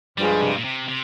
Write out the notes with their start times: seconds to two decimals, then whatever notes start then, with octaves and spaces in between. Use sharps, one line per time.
0.18 G2 F3 G3 G#3
0.41 C3
0.57 A#2
0.64 C3
0.88 C3